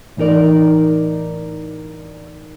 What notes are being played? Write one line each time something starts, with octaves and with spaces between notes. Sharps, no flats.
A2 E3 D#4 A#4 D5